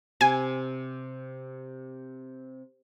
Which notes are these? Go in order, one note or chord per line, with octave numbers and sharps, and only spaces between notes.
C3 G#5